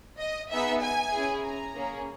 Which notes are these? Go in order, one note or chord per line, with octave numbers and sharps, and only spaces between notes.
D#5
B3 D#4 G#4 E5
G#5
C#4 E4 G#4
A#5
A#3 C#4 G#4